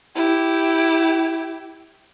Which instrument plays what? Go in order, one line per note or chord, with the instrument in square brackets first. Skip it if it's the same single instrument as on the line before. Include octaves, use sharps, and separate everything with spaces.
[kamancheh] E4 G4